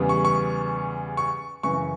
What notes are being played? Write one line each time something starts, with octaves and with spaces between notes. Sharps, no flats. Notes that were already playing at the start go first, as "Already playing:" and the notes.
Already playing: E2 C#3 G3 B3
C#6
C#6
C#6
F#2 C#3 E3 C#6